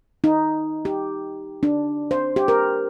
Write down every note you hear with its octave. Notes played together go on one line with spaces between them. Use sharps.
D#4
G4
D4
C5
G4
A#4